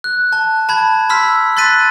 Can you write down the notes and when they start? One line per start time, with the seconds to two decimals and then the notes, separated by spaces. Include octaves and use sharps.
0.04 F#6
0.33 A5
0.69 A5 B5 G#6
1.09 B5 C6 E6 F6 B6
1.57 C6 F#6 A6 B6 D#7